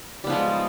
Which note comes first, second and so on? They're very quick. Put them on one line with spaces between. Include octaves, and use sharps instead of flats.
G3 B3 F3 G#3